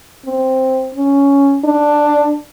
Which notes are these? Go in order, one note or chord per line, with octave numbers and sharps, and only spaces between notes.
C4
C#4
D4